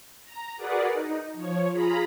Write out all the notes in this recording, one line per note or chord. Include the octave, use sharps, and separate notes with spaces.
A#5
F#4 G#4 A#4 B4 D5 F#5
D#4
F3 C#5
F4 G#4 A#5 B5